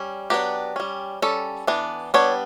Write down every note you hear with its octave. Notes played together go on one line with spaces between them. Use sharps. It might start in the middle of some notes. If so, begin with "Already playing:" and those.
Already playing: G3 C#4
F#3 B3 D4 G4
G3 C#4
G3 C#4 A4
E3 B3 D4
G3 B3 D4 C#5